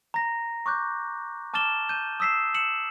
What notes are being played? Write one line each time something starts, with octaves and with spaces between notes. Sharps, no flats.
A#5 A#6
C#6 D6 F#6 G6
A5 D6 F6 A6 E7 G7
G6 D#7
D#6 E6 B6 C7 E7
E6 C#7 E7 F#7